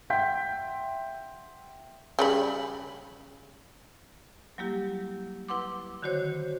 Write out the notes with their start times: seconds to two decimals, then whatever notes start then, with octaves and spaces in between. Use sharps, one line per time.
0.10 E5 F#5 G5 C6 G6 B6
2.19 C#3 G3 B5
4.58 F#3 G3 A#3 E4 G4
5.48 E4 B4 F#5 C6 D6
6.02 D3 D#3 F#4 C5 C#5